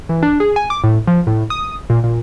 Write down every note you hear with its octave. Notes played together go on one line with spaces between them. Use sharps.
E3
D4
G#4
G#5
D6
A2
F3
A2
D#6
A#2
A#2